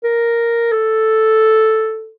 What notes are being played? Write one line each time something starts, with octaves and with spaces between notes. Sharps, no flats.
A#4
A4